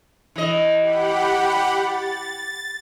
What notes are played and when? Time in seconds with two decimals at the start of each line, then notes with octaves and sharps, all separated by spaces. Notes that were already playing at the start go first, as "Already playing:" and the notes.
0.36 E3 D#5
0.79 G4 F#5 B5
1.77 A6